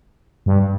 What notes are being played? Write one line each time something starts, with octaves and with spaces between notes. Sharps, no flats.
G2